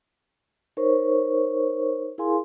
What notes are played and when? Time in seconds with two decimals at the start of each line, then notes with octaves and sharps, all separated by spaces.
0.77 D#4 A#4 C5 C#5 C#6
2.18 E4 G#4 A#4 F5 G#5 C6